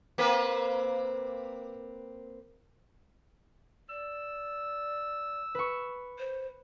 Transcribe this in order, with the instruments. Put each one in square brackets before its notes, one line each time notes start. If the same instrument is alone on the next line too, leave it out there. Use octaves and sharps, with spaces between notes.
[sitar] A#3 C4 B4
[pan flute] D5 [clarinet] E6
[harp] B4 C#6
[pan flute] C5